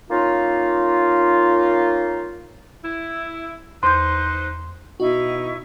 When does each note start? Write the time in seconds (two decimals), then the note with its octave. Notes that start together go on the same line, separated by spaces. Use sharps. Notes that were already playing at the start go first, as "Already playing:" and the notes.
0.10 A#3 C#4 D#4 F4
2.83 E4
3.83 E2 D#4 B4 C5 C6 G6
5.00 B2 D#4 E4 F#4 C#6